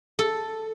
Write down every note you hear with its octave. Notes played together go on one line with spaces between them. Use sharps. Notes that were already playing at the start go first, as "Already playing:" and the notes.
A4